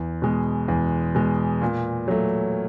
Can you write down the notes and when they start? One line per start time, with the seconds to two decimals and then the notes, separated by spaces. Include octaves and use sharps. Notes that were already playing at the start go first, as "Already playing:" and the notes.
Already playing: E2
0.22 B2 G#3
0.68 E2
1.15 B2 G#3
1.62 A#2
2.08 F#3 A3